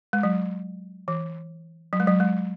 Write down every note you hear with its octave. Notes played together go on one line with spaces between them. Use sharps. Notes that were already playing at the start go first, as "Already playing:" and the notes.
G#3
F#3
E3
F#3
G#3
F#3
G#3